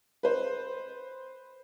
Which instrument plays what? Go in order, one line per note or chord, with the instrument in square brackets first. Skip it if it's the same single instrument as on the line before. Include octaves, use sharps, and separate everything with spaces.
[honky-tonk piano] B4 C5